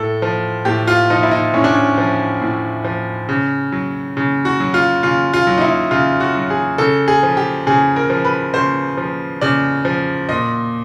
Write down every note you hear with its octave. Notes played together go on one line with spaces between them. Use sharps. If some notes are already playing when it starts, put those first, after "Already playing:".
Already playing: A2 A4
F3
A2 G4
F4
F3 D#4
E4
D#4
A2 C#4
D4
C#4
F3
A2
F3
C#3
F#3
C#3
F#4
F#3
F4
C#3 F4
F4
F#3
D#4
E4
C#3 F4
F#4
F#3
G#4
C#3 A4
G#4
F3
G4
C#3 G#4
A#4
F3
B4
C#3 C5
F3
C#3 D5
F3
A#2 D#5